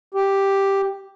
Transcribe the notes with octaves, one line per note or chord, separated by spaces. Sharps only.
G4